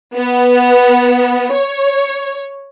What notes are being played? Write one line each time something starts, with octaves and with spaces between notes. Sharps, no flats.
B3
C#5